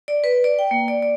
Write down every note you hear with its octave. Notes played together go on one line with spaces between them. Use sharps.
D5
B4
D5
G5
A#3
D5
D5